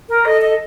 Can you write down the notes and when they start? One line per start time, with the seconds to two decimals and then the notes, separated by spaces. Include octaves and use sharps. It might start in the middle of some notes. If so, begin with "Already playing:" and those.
0.09 A#4
0.25 A4 D#5
0.41 D#5